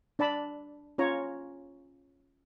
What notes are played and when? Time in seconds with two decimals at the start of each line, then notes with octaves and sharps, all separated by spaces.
0.19 D4 D5 A5 B5
0.98 C#4 F4 C#5 A#5